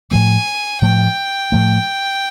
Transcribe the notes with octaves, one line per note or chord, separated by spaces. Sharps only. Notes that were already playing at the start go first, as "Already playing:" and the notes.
A2 F3 A3 G#5
A2 F3 A3 G5
A2 F3 A3